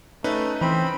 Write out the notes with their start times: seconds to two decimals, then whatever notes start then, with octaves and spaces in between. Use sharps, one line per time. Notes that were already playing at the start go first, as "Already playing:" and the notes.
0.24 A3 C#4 D#4 B4
0.61 E3 C4 B5